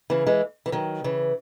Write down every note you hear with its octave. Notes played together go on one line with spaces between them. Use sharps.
C#3 E3
E3 G#3
E3
D#3 F#3
C#3 E3